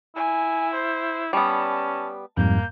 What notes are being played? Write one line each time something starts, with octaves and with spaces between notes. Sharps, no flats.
E4 G#5
C5
G3 B3 C#4 A5
F2 G#2 G3 A#3 G6